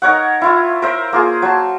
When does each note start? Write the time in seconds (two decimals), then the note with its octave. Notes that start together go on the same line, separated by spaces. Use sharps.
0.02 D#4 A#4 C#5 F#5
0.41 E4 F4 E5
0.82 A#4 C5 E5
1.13 A#3 F4 G#4
1.42 F#3 A5